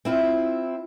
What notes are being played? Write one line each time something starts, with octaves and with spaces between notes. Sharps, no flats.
C4 E4 F4